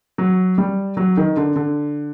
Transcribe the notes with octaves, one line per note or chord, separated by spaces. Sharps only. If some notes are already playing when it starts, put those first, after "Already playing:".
F#3
G3
F#3
D#3
D3
D3